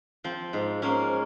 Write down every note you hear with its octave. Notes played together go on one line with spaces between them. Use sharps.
F3 C4
G#2
G#2 A#3 C#4